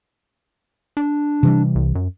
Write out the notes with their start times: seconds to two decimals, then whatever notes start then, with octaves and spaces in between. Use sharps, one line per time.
0.97 D4
1.43 C3 E3 G3
1.75 C2
1.95 F#2